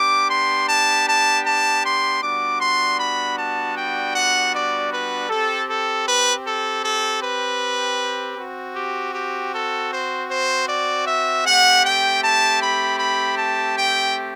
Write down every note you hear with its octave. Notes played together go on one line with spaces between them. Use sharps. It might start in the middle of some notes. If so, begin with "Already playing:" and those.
Already playing: B3 D4 G4 D6
C6
A5
A5
A5
C6
G3 B3 D4 F#4 D6
C6
B5
A5
G5
F#5
D5
B4
C4 G4 A4
A4
B4
A4
A4
B4
C4 F#4
G4
G4
A4
C5
C5
D5
E5
A3 C4 G4 F#5
G5
A5
B5
B5
A5
G5